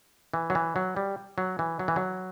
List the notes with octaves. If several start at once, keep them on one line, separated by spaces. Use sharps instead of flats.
E3
F#3
E3
F#3
G3
F#3
E3
F#3
E3
F#3